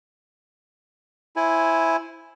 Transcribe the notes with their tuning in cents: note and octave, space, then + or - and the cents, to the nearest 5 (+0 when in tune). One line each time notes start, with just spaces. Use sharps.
E4 +0 C5 +10 G#5 +0